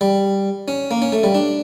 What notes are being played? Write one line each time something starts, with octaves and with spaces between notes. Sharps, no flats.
G3
C#4
A#3
C#4
A3
G3
D4